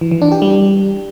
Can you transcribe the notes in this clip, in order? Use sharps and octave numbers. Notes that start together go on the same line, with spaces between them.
E3
E3
D4
G4
G3